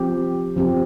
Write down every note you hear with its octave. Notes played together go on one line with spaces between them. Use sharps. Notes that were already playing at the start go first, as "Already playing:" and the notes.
Already playing: F3 C4 G4
F3 C4 G4